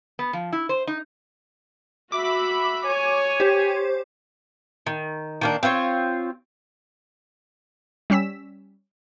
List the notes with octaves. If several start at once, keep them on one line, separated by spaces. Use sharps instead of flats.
B3
F3
E4
C5
D#4
F#4 E5 B5 D6
C#5 G#5
G4 C5
D#3
D#3 A#3 D4
C4 F4 B4 C#5
G3 C#4 E6 B6 E7